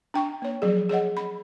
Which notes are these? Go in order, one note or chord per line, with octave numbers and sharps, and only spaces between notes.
D4 G5 C#6
A#3 C#5
F3 F#3 G#4
G#4 C#5 D#5 F#5
B5